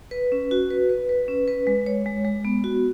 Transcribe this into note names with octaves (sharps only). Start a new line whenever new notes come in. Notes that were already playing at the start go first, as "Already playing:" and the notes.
B4
C#4
F#4
B4
B4
B4
C#4
B4
G#3
C#5
G#3
G#3
B3
F#4